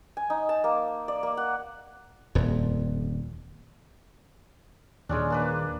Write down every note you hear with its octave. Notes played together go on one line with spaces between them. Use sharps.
G#5
D#4
A5
A#3
D5
A#3
F#5
D#1 F2
D#2 A#2 D#3 G#3 C#4 D4
A#3 D4 B4